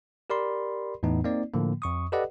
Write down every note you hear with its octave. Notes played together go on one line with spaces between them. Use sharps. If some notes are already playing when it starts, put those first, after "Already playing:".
G4 A#4 D5 B5 C6
E2 A2 E3 B3 D#4
A#3 C4 D#4 D5
A2 D3 F3 A#3
F2 C#6 D#6
G4 A4 B4 D5 D#5 F#5